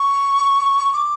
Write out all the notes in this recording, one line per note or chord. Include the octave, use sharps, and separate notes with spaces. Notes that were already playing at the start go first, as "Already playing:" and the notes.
Already playing: C#6
D6